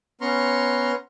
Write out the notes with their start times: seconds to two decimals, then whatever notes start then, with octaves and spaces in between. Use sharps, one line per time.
0.21 B3 C#4 A#5 C6 C#6 F6